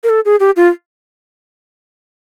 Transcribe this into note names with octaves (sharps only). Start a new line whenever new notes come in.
A#4
A4
G#4
G4
F4